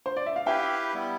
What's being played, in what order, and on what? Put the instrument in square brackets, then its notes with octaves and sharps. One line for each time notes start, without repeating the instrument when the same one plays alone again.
[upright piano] C5
D5
E5
F5
[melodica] E4 G4 B4 F5 [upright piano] E5 G5
[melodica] G3 B3 E4